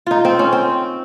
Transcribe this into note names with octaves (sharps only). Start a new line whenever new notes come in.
D#4 F4
C4
C#4
C4